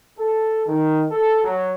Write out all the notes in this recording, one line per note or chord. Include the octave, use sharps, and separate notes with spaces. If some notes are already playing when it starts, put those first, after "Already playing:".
A4
D#3
A4
F#3